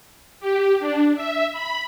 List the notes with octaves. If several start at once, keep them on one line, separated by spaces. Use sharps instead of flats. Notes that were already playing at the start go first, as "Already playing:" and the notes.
G4
D4
E5
B5